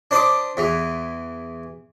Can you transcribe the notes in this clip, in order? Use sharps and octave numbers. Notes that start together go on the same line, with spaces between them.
D4 C5 B5 D6 D#6
E2 E3